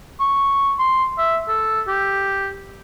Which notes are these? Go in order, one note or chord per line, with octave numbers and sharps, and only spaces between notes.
C#6
C6
E5
A4
G4